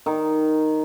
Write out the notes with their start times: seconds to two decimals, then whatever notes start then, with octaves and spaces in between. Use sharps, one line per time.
0.06 D#3